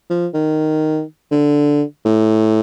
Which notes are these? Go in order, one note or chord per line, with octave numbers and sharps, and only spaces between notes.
F3
D#3
D3
A2